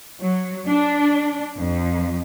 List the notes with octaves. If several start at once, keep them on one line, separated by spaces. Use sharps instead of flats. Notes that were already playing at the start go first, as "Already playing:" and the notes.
F#3
D4
F2